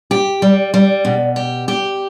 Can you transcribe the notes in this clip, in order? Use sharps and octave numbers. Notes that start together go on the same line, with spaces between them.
G4
G3
G3
B2
G4
G4